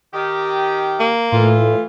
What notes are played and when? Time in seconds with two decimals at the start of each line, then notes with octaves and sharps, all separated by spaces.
0.14 D#3 G4
1.00 A#3
1.32 A2 E3 A3 F4